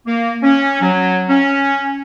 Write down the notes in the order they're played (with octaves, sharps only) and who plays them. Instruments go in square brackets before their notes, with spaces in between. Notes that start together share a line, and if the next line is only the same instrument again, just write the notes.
[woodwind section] A#3
C#4
F#3
C#4